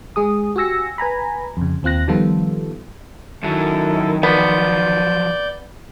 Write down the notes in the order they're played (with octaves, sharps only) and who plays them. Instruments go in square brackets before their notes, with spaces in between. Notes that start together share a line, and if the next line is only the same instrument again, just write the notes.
[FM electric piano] G#3 G#4 D#6
F#4 G4 G#5 E6 A#6 C#7
B4 G#5 A#5 B5
F2 C#3
D#2 C4 F4 F#6 A#6
D#3 F3 G3 B3 F4 A4
[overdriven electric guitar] F#2 F#3 [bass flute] D#3 [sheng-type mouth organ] E4 A4
[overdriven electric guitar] F3 F#3 [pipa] B3 [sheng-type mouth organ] D5 G6